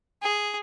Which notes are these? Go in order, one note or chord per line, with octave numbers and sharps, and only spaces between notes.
G#4